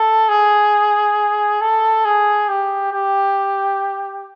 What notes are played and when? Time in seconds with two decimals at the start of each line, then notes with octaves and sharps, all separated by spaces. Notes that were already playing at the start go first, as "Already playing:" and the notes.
Already playing: A4
0.29 G#4
1.61 A4
2.05 G#4
2.49 G4
2.92 G4